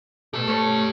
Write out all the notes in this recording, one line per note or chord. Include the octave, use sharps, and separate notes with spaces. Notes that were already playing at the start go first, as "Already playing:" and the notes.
B2 A3 G4 A5
A3 C#4 C#5